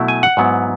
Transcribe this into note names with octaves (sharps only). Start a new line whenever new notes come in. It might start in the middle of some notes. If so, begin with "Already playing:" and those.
Already playing: B2 F#3 A3 E4
G#5
F#5
G#2 F#3 B3 E4